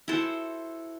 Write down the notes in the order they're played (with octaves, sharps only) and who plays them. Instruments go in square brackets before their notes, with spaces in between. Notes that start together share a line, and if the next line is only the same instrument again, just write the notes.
[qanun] E4 F#4 A4 C5